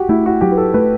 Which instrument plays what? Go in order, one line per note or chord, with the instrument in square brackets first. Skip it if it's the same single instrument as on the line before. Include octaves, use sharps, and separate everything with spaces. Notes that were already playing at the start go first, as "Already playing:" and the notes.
Already playing: [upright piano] F#4 G4
[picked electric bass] A3 [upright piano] E4
[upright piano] F#4
[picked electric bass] F#3 [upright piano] G4
[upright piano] B4
A4
[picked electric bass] A3 [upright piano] B4